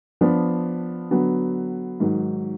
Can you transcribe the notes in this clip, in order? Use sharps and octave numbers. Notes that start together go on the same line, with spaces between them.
F3 B3 D4
D3 F#3 B3
G#2 D#3 F#3